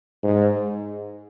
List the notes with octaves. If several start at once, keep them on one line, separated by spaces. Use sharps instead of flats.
G#2